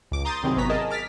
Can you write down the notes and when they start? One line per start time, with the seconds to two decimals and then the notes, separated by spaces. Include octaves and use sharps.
0.12 C#2 D6
0.25 A#5 C6 D#6 G6 A6
0.43 C3 D#3 F#3 C4 E4 G#4
0.57 G#1 B3 C#5 A#5 B6
0.69 G#4 A#4 D#5 A5
0.90 D6 F6 A6 B6